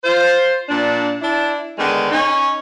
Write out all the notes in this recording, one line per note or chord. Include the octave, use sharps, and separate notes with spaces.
F4 C5
A#2 D4
D4 E4
D3 D#3 G#3 B3
C#4 D#4